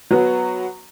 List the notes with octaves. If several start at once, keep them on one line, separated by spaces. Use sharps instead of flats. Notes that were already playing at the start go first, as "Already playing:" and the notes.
F#3 B3 F#4